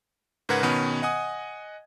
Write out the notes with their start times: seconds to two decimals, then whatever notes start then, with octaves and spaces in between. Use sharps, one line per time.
0.49 G#2 C#3 A#4 B4 F#5 G#6
0.63 B2 D#3 B3 C#4 B4 B5
1.02 D#5 F#5 G#5 D#6